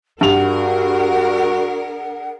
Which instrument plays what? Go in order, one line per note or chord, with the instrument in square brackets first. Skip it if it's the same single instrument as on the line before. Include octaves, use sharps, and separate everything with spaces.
[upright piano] G2 F7 [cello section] D4 G#4 A#4 [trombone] F#4 [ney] F#5